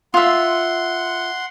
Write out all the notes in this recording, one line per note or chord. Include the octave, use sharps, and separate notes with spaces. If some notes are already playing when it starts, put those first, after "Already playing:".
F4 E5 F#5 C6